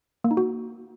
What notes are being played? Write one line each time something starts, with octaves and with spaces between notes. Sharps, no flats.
A#3
D#4
F#4